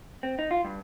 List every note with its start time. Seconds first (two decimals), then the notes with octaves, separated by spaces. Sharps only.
0.23 C4
0.39 D#4
0.51 F4
0.64 G2